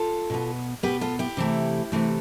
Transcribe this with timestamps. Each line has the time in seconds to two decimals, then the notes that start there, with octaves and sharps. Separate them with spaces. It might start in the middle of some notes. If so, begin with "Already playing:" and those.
Already playing: F4 A4
0.30 B2 B3
0.83 B2 B3 G4 B4
1.01 F4 A4
1.19 E4 G4
1.37 C3 E3 A3
1.92 C3 E3 A3